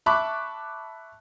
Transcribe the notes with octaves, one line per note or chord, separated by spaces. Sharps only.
E5 A5 B5 C#6 D6 F#6